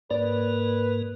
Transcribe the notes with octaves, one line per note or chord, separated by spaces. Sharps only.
G#2 A#3 A#4 B4 D5